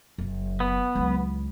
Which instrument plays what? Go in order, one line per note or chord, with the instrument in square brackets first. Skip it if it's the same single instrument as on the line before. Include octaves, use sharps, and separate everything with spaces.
[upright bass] F#1
[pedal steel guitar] B3
[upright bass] C#2 F#3